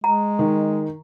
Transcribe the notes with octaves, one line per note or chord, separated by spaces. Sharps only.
G#3 A#5
D#3